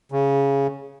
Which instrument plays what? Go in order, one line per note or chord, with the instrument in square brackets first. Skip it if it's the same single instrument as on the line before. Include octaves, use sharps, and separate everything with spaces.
[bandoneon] C#3